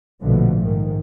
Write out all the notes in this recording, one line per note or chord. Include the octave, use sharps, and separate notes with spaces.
A#1 B2 D3 F3 A3
G#2 D#3